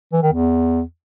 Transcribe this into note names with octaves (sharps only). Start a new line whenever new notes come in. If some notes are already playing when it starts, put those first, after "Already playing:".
E3
D#3
E2